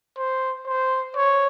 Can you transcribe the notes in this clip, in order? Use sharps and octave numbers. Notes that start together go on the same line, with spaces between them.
C5
C5
C#5